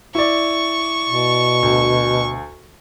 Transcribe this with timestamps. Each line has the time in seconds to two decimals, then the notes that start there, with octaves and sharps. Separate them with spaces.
0.15 E4 D5 C#6
1.09 B2
1.63 D2